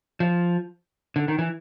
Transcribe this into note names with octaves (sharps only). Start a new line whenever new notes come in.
F3
D3
D#3
E3